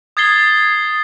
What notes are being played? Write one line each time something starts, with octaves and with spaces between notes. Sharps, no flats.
D#6 G#6 A6 C7 G7